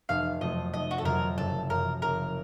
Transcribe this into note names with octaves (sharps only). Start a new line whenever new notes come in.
F1 F5
F2 C3 F#3 A3 D#5
F1 D#5
F#4
A4
F2 C3 F#3 A3 A#4
F#1 A4
F#2 F3 A#4
F#1 A#4